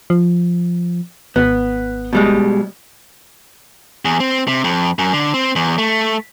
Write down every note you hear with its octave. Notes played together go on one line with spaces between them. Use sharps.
F3
G#1 B3
B2 G3 G#3
E2
C4
C3
F2
F#2
D3
C4
E2
A3